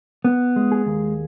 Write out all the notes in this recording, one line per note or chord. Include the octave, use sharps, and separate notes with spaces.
B3
G#3
G#4
D#2